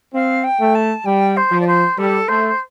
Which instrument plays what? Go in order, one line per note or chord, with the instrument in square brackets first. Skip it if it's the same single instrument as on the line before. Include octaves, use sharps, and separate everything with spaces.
[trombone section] C4 [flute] F5
[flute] G5
[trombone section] A3
[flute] A5
[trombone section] G3 [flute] G5
[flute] C5
[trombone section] F3
[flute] D5
C5
[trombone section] G3 [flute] A4
[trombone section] A3 [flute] C5